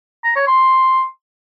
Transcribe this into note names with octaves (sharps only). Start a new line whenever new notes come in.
A#5
C#5
C6